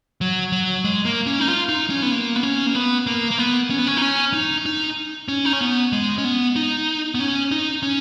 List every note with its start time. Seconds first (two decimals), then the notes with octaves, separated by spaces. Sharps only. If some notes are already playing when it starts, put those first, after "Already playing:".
0.21 F#3
0.52 F#3
0.84 G#3
1.05 A#3
1.26 C#4
1.40 D#4
1.48 F4
1.69 D#4
1.90 C#4
2.02 B3
2.12 A#3
2.36 B3
2.43 C#4
2.66 A#3
2.75 B3
3.07 A#3
3.31 A#3
3.38 B3
3.70 C#4
3.79 B3
3.87 C#4
3.97 D#4
4.02 C#4
4.34 D#4
4.66 D#4
5.28 C#4
5.45 D#4
5.53 C#4
5.61 B3
5.92 G#3
6.18 C#4
6.24 B3
6.56 D#4
7.15 B3
7.20 C#4
7.51 D#4
7.83 C#4